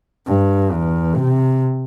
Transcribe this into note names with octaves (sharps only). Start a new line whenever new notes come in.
G2
E2
C3